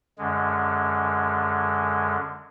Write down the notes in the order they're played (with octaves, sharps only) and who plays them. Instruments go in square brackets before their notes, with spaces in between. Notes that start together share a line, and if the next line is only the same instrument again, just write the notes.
[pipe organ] F#2 D3 G#3